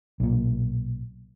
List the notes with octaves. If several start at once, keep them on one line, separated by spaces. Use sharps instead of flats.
B1 A#2